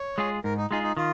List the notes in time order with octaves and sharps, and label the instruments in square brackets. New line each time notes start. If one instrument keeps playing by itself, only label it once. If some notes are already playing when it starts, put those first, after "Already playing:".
Already playing: [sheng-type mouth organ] C#5
[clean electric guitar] G#3 F4 G#4
[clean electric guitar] G#2 [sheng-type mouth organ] A#4
[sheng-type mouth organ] D#4
[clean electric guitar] G#3 F4 G#4 [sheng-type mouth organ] D#4
[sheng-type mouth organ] D#4
[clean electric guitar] D#3 [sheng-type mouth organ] F4